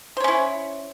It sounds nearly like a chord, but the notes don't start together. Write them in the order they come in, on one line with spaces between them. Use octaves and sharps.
C5 C#5 C#4 E4